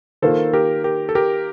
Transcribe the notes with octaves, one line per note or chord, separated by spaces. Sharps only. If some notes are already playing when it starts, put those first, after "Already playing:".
D#3 A#3 F4 A4 C5
G4 A#4
G4 A#4
A4
G4 A#4